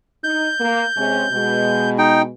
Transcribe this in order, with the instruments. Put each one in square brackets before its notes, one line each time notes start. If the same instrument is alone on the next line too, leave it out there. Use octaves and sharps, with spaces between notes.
[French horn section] D#4 [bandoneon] G6
[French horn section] A#3
C3 G#3 C#4
B2 G#3
[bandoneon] D#4 G5